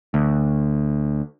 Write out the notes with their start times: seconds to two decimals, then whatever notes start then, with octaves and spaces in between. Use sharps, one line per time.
0.14 D2